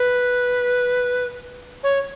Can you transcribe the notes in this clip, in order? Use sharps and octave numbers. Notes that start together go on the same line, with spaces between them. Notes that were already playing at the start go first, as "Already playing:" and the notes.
Already playing: B4
C#5